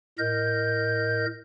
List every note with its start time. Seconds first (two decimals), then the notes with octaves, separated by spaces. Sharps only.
0.19 A2 A#4 D#5 G6